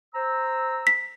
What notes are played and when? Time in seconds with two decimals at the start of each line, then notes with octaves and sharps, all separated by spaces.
0.14 C5 A#5 E6
0.87 B6